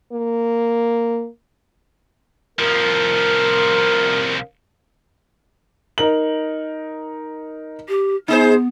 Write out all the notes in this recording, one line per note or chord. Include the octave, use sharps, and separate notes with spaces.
A#3
C2 F3 A#4
D#4 A#4 F#7
G4
B3 D#4 G#4 C5